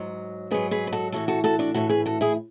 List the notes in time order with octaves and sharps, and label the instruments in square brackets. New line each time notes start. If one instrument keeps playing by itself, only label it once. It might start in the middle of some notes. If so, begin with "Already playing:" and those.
Already playing: [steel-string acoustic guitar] G#2 F#3
G#2 F#3 G#4 B4
G#4 B4
B4
F#4 A4
A2 E3 F#4 A4
F#4 A4
F#4 A4
D4 F#4
A2 E3 F#4 A4
G#4 B4
F#4 A4
E4 G#4